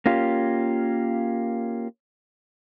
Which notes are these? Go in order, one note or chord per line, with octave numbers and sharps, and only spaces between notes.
A#3 C#4 F4 G4